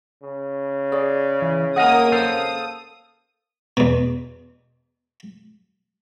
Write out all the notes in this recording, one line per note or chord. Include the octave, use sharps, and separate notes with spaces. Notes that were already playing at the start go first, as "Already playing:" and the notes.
C#3
G#4 C#5 D5
E3
A#3 G#4 D#5 F5 F#5 G#5 D#6
A4 C5 F5 D#6
E2 B2